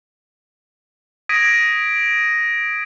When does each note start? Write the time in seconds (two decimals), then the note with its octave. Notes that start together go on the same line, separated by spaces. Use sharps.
1.29 D#6 G#6 A#6 B6 D7 D#7